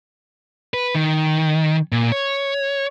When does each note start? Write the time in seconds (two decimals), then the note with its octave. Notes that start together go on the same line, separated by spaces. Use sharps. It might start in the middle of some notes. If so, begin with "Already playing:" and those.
0.74 B4
0.95 D#3
1.92 A#2
2.12 C#5